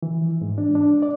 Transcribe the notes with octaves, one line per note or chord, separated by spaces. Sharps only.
E3
G#2
D4
D4
D5